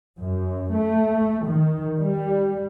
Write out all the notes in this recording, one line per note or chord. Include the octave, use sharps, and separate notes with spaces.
F#2
A3
D#3
G3